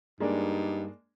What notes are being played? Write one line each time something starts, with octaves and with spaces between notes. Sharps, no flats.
G2 G#3 A#3 D4 D#4